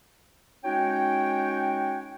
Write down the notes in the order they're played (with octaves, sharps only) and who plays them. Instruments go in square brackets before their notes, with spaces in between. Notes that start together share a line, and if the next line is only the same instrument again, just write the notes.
[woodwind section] G#3 C#4 D#4 F#4 C#5 G5